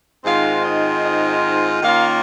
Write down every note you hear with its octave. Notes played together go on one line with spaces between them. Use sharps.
G#2 D#3 G#3 C4 F4 F5
D#5
D#5
D#3 A#3 C#4 F4 F5